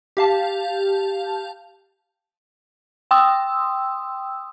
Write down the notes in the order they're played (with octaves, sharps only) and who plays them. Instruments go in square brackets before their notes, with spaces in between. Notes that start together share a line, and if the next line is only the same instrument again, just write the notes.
[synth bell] G4 F5 A5
G5 C6 D#6 E6